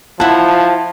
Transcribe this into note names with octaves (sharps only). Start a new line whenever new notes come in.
F3 E4 F#5 A5